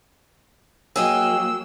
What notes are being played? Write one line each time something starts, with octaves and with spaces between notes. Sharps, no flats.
F#3 A#3 G#4 D#5 G5 E6